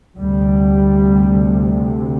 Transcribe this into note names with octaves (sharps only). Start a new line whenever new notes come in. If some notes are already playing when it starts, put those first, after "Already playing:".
D2 C3 G3